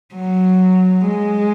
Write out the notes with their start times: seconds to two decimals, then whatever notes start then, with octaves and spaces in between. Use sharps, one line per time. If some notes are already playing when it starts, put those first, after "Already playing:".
0.15 F#3
1.06 G#3